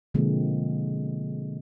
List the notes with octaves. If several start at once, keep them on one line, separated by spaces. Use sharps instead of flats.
B2 D3 F3 G#3 A#3 C4